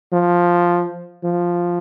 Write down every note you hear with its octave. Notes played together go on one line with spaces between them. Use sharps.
F3
F3